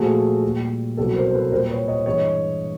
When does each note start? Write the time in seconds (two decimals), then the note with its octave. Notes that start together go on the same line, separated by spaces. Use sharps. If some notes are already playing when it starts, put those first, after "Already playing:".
Already playing: A#2 F3 A3 F#4 G#4
0.43 A#2 G3
0.97 C2 B2 F#3 G4 A4
1.15 A#4 C5
1.26 C5
1.34 A4 B4
1.52 A#2 G3 A#4 C5
1.70 B4 C#5
1.88 C#5 D#5
2.06 G2 E3 G#3 C#5 D#5